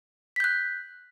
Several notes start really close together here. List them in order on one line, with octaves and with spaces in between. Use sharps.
B6 G6 F#6